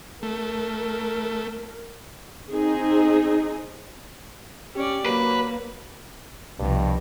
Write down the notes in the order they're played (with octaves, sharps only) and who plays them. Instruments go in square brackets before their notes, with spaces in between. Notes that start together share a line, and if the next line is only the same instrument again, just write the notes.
[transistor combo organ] A3 [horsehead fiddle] A#4
[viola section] C4 D#4 G#4
[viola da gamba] C#4 D5 [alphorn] G4
[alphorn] F#3 [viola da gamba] A#3 [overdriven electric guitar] B4
[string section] C2 B2 F3 [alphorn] G2